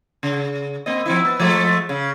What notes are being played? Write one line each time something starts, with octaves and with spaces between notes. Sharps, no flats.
C#3
A#3 C4 D#5
F3 C4 E4
B3
F3 G#3 A3
C#3